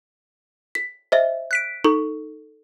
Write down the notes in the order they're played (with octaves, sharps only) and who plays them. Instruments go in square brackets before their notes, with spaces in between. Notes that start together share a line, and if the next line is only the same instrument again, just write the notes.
[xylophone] B6
C5 D#5 E5
[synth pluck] F#6 B6 D7
[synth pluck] D#4 [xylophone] A4 C#6